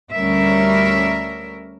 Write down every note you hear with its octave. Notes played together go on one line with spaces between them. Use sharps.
D2 G3 C#4 A#4 E5